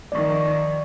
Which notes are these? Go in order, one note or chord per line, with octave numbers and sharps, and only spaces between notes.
D#3 F3 D5 C#6